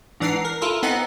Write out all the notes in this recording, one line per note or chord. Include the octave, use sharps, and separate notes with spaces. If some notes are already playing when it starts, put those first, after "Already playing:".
G#2 E3 D4 F#5 A#5 C7
A#4
E4 F4 A4 A#4
B3 C4 D#4 A4 D#5 F#5